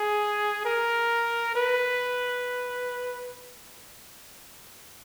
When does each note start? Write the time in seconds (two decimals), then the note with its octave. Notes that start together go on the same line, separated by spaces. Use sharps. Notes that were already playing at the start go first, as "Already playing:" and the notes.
Already playing: G#4
0.65 A#4
1.55 B4